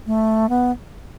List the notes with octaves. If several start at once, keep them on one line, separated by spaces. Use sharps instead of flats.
A3
B3